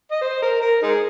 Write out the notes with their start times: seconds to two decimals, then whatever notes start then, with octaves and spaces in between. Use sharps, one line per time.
0.12 D#5
0.21 C5
0.42 A#4
0.61 A#4
0.82 D#4 G#4